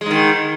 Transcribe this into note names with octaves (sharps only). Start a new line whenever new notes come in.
G#2 D#3 G#3